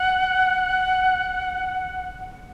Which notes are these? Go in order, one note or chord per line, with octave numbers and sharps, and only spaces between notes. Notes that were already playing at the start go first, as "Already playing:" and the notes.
Already playing: F#5